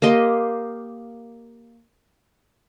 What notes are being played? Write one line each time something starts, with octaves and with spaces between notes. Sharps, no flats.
A#3 G4 D#5 C6